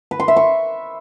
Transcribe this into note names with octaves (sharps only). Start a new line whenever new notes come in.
B4
C6
E5
C#6